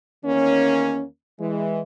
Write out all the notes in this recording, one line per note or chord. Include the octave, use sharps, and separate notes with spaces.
E2 D#3 A#3 C#4
E3 G#3